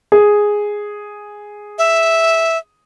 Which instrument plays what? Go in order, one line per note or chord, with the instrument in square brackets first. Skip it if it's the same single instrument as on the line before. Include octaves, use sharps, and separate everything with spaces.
[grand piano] G#4
[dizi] E5